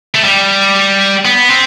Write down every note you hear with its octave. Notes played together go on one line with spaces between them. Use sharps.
A3
G3
B3
C4